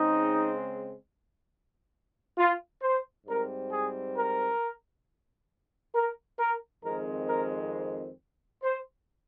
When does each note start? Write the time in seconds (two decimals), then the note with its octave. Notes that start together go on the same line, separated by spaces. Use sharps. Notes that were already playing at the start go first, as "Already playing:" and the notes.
Already playing: C#3 G#3 C4 D#4
2.38 F4
2.82 C5
3.27 G#2 G3 C4 A#4
3.72 G#4
4.17 A#4
5.95 A#4
6.40 A#4
6.85 F2 D#3 G#3 C4 A#4
7.29 A#4
8.64 C5